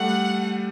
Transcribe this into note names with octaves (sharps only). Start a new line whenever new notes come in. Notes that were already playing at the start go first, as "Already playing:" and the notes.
Already playing: G3 A3 F#5